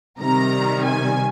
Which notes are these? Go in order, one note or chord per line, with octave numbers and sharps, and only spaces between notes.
C3 D#3 G3 A#5
G#5